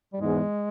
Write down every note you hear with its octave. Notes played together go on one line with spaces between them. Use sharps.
G3
E2 G#2 G#3